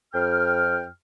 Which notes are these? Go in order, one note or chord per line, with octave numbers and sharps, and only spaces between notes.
F2 G5 F6